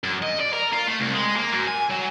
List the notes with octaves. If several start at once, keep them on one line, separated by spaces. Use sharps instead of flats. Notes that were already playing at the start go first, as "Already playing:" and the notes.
F#2
D#5
D5
A#4
F4
A3
C2
G#3
A#3
F#2
G#5
F#3